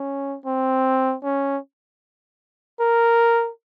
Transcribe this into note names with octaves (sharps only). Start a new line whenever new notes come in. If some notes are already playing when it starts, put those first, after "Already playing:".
Already playing: C#4
C4
C#4
A#4